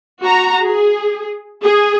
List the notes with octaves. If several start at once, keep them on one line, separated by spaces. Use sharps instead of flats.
F#4 A#5
G#4
G#4